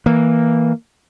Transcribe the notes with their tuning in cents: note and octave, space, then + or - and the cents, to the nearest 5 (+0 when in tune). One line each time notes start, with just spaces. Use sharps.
E3 -15 A#3 -5